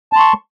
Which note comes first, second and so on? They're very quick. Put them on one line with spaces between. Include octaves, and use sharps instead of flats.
A5 C6 C#6